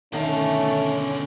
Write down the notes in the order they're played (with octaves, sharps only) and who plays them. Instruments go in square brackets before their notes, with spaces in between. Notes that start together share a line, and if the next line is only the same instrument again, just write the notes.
[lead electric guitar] B2 D3 [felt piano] D#3 [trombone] A3 [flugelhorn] C#4